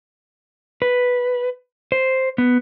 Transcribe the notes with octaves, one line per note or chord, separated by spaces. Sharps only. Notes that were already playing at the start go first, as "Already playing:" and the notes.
B4
C5
B3